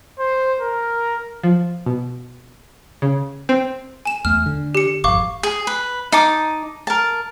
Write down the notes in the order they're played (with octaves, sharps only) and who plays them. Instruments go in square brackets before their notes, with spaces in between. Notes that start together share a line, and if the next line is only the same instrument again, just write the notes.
[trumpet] C5
A#4
[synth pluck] F3
B2
C#3
C4
[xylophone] G#5 E7
[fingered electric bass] E2 A3 [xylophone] F6
[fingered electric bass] D3
[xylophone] G4 C#7
[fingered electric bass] G#1 F2 [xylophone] F5 C#6 D6
[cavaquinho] G#4
B4
D#4 A5 D6
A#4 A5